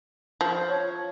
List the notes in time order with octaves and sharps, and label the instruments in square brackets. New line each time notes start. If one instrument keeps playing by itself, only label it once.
[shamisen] F3
[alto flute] C#5